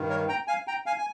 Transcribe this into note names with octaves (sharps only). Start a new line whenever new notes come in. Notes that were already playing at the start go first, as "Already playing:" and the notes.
Already playing: G2 D#3
A#4 C#5
G5 A#5
F5 G#5
G5 A#5
F5 G#5
G#5